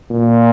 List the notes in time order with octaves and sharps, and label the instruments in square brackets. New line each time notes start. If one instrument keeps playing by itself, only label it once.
[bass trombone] A#2